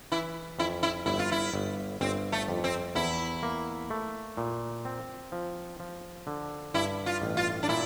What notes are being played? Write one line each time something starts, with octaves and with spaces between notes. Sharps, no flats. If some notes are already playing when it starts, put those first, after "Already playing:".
E3 E4
F2 E4
E4
G1 E4
F4
E4
G1
G1 C4
A3
F2
C4
E2 E4
A#3
A3
A#2
C4
F3
F3
D3
G2 E4
F4
A1
F4
D4
A#2 E4